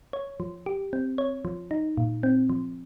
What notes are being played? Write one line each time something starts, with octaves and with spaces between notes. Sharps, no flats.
C#5
F3
G4
C4
C#5
F3
D#4
A#2
C4
F3